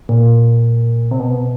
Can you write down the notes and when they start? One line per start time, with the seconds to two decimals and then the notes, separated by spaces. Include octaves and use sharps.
0.09 A#2
1.11 C3
1.19 B2